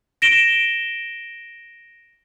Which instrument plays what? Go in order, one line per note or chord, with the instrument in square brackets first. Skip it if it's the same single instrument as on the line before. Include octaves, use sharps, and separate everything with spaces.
[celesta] A#6 D7 E7 G7